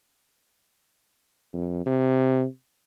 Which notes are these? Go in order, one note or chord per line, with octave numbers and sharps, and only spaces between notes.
F2
C3